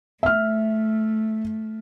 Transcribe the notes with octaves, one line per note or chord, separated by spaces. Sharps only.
A3 E5 F6